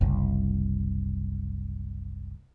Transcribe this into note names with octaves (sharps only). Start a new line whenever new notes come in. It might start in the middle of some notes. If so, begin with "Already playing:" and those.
F#1 C2